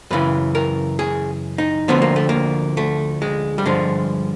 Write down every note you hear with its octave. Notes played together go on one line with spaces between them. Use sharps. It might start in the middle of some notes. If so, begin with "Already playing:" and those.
F#2 C#3 E3 B4
A#4
G#4
D#4
D2 D3 F3 B3
A#3
A3
A#3
A3
G#3
G3
G2 D3 F3 G#3